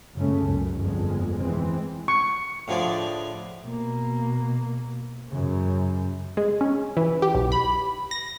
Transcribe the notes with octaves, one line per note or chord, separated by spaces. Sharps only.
F#1 C#3 G#3 A3 C#4
C#2 F#2
G1 F2 G#3
E3 G#3 C4
C#6
A2 D3 F3 G#4 D5
B2 A#3
F#2 C#3
G#3
C#4
E3
G4
B1
B5
A#6